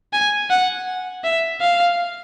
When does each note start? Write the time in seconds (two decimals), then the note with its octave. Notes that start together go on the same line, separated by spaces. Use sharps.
0.13 G#5
0.50 F#5
1.24 E5
1.60 F5